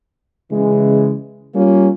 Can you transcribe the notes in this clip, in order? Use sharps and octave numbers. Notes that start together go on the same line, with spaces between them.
C#3 E3 G#3
G3 A#3 C#4 F4